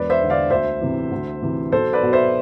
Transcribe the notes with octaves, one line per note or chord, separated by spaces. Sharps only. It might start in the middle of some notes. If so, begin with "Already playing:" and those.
Already playing: E1 B4 D5
C5 E5
E2 D3
D5 F5
D2 C5 E5
C3 E3
D2
C3 E3
B1 A4 C5
B4 D5
B2
C5 E5